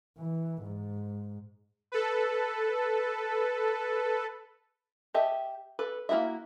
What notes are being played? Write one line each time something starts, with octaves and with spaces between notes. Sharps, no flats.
E3
G#2
A4 B4
G4 D#5 E5 A5
A4 B4
A#3 C4 E4 F#4 E5